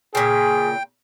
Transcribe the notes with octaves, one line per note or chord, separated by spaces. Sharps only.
A#2 C#3 G#4 G5